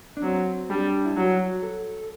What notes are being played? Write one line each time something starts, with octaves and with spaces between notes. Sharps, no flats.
D4
F#3 C4
G3 D4
E4
F#3 F#4
F#4
A4